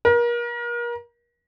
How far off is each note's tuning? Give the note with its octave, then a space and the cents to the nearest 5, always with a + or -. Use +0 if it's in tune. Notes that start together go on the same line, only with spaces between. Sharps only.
A#4 +35